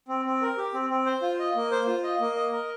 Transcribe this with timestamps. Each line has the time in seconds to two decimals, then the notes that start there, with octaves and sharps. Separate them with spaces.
0.08 C4
0.25 C4
0.42 A#4
0.58 G4
0.74 C4
0.90 C4
1.06 C5
1.22 F4
1.39 D#5
1.56 A#3
1.72 C5
1.87 F4
2.03 D#5
2.20 A#3
2.36 D#5
2.52 A#4